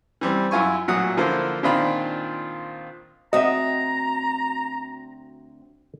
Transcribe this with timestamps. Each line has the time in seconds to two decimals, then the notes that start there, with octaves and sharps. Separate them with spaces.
0.21 E3 G3 C4
0.51 F#2 E4 F4 G#5 C#6
0.88 A1 A#2 F#3 F#5 D#6
1.17 D3 F3 A#3 E4 F4 C5
1.63 A#2 D#3 C4 D4 F4 B5
3.33 D2 C4 F#4 D#5 E5 A#5